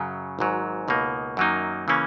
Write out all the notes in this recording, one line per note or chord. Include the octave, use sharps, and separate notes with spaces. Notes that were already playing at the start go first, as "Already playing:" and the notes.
Already playing: F#2 C#3 F#3
G#1 G#2 F#3
C#2 B2 A#3 D#4
F#2 D#3 F#3 A#3 D#4
C#3 E3 A#3 C#4